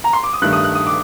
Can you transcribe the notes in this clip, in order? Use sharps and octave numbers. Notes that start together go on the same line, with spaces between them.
A#5
C6
D6
D#6
G2 D#3 A3 F#6
D#6
F#6
D#6
D6